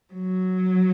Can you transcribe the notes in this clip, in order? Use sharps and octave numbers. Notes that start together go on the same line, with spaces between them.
F#3